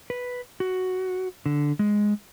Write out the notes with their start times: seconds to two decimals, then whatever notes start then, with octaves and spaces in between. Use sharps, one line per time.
0.10 B4
0.60 F#4
1.46 D3
1.79 G#3